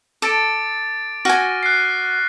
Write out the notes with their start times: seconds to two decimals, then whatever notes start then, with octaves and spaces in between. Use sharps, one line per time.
0.22 A4 D6 A6 D7
1.25 F#4 G#5 C#6 F6 A#6
1.63 F#6 C7